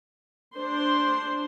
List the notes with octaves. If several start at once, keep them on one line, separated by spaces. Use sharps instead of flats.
D4 C5 C6